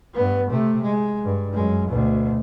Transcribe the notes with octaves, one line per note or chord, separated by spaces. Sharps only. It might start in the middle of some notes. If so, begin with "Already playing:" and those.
G2 B3
C3 A3
G#3
G2
F#2 G#3
D2 B2